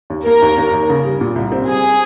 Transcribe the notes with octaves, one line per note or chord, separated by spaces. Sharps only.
D#2
A#3 A#4
D#2
D#2
D#2
C#3
G3
A#2
C2
C4
G3 G#4